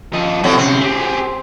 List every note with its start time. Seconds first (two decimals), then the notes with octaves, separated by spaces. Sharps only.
0.13 F3 D#5
0.44 A2 F#3 G3 C4
0.58 C3 C4 C#4
0.81 G4 G#4